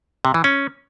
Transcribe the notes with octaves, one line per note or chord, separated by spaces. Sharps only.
C3
E3
C#4